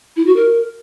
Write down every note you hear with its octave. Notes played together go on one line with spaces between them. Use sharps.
E4
F#4
A#4